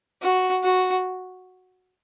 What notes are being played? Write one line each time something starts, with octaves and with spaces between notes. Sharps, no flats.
F#4
F#4